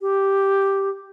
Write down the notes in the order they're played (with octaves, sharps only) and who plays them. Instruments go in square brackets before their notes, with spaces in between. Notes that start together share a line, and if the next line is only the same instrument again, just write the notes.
[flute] G4